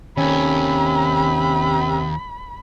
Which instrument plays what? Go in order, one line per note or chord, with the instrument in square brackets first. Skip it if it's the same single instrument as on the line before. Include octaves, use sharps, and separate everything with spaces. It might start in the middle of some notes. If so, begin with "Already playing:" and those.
[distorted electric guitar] D#2 [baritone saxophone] C3 [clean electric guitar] D#3 C#4 [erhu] B5